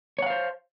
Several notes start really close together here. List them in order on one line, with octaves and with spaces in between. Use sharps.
C#5 F#5 F5 C5